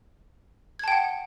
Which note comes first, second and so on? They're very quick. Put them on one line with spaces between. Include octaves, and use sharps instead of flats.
G#6 A5 G5 F#5